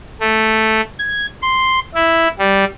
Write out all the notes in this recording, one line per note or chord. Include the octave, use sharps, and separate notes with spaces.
A3
G#6
C6
E4
G3